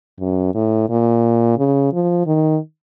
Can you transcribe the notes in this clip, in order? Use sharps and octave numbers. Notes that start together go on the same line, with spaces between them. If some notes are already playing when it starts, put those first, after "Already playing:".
F#2
A2
A#2
C#3
F3
D#3